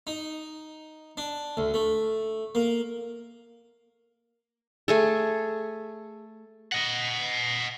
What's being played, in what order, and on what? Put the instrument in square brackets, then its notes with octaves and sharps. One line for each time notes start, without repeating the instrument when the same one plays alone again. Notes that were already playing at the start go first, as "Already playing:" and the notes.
[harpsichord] D#4
D4
D2
A3
A#3
[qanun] A3 G#4 A4
[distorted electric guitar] D#5 F#5